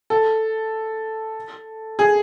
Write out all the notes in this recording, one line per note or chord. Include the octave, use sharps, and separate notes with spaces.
A4
G#4